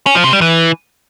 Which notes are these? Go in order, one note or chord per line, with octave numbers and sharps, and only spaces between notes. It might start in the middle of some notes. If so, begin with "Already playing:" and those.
C#4
F3
C3
G3
E3